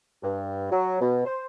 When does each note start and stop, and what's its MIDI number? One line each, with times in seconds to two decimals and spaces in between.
0.23 0.68 43
0.71 0.98 54
1.00 1.21 47
1.26 1.46 72